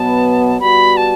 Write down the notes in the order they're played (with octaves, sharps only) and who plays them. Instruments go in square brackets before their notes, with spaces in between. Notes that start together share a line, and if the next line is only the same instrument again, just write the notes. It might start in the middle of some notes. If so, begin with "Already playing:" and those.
Already playing: [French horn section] B2 F#3 B3 [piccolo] A5
[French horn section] G3 B3 F#4 [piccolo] B5
[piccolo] A5